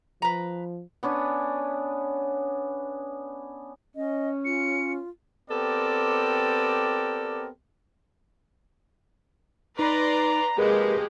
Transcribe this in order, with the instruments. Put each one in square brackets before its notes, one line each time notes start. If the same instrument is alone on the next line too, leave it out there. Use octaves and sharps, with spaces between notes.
[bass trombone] F3 [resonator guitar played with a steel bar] B4 A#5
[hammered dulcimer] B3 C#4 D4 C#5
[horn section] C#4 [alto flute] D#5
[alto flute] F4 [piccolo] C#7
[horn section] B3 C4 G4 A4 A#4 D5
[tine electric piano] D#4 [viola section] B4 D5 C6 [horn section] A#5
[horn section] C3 F3 A#3 [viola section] G#3 G4 [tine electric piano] G#4 A#4 B4